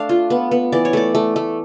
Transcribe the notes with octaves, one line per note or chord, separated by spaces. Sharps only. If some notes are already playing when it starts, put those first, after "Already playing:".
Already playing: A3 D4 F5
F4
B3
B3
E3 D5
C#5
A3 D5
A3
A3